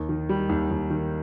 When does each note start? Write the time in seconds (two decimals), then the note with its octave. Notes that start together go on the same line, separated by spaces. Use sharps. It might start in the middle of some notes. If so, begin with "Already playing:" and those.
Already playing: D#2
0.09 D#3
0.29 G3
0.49 D#2
0.71 D#2
0.90 D#3